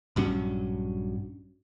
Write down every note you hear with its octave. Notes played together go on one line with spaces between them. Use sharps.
A#1 G2 F#3 C#4